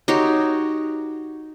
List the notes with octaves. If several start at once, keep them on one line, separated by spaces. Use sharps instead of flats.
D#4 F#4 G4 C#5